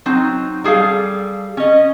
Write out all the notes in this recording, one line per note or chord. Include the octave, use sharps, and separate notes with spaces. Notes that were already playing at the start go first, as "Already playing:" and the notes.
F#3 C4 D#4
G3 G#4 A4 F5
C#4 D#5